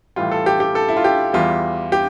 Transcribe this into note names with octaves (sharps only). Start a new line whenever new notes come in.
A2 E3 G3 F4
A4
G4
G4
A4
E4
F4
G4
E2 E3 G3 F4
G4